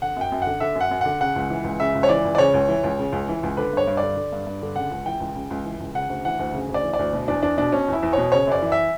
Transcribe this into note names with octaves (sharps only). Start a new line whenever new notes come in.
D3 F#5
F#2 G5
F#2
D3 F#5
D3 E5
F#2
F#5
F#2
D3 F#5
C#3 F#5
C#2
E3
C#2
C#3 E5
C#2
C#5
E3 D5
C#2
D5
C#3 C#5
C#2
E3
C#2
C#3
C#2
E3
C#2
D3 B4
G2 C#5
G2
D3 D5
D3
G2
G2
D3
C#3 F#5
C#2
E3 G5
C#2
C#3
C#2
E3
C#2
C#3 F#5
D2
E3 F#5
D2
C#3
D2
D5
E3
D5
D2
B2
E2 D4
E2 D4
B2 D4
B2 C#4
E2 E4
E2
B2 C#5
C#3 C#5
F#2 D5
E3
E5